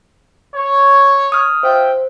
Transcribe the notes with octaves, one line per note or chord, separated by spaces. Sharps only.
C#5
D#6 F6
F4 C5 E5 G5